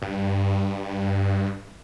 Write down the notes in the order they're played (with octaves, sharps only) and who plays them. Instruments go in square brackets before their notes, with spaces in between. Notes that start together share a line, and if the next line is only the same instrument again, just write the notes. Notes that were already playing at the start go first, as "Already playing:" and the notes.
[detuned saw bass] G2